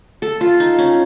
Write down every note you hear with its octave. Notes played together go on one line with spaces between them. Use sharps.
A4
F4
D#4
C#4